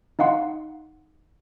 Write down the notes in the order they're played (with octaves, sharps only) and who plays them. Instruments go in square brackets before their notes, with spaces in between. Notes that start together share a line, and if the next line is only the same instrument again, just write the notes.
[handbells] D#4 D#5 F5 F#5 C6